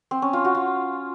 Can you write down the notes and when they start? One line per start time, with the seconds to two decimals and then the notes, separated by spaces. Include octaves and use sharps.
0.11 C4
0.22 C#4
0.33 F4
0.45 F#4
0.55 F4